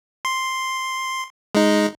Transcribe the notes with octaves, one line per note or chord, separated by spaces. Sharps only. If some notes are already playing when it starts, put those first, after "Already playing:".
C6
G#3 D#4